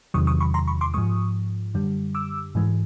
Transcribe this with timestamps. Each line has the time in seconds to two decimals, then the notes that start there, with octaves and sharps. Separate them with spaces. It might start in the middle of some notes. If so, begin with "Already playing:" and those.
0.14 E2 C3 D#3 F#3 C#6 D#6
0.27 C#6 D#6
0.40 B5 C#6
0.54 A#5 C6
0.68 B5 C#6
0.81 C6 D6
0.94 G#2 F3 G#3 C#6 D#6
1.74 F#2 D3 G3
2.15 D6 E6
2.55 G#2 E3 G#3